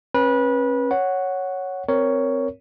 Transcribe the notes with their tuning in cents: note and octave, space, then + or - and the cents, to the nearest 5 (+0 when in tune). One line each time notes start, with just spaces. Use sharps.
C#4 -35 B4 -25
C#5 +0 F#5 +0
C4 -5 A#4 +0 C#5 +10